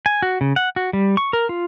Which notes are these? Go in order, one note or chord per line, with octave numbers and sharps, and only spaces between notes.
G#5
F#4
C#3
F#5
F#4
G3
C#6
A#4
F4